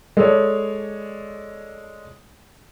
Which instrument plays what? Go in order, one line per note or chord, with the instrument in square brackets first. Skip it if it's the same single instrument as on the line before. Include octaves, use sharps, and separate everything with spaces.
[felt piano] G#3 A4 C#5 D5